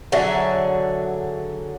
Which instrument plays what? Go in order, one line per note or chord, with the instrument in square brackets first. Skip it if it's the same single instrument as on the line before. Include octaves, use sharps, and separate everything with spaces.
[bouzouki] D3 F#3 G#4 E5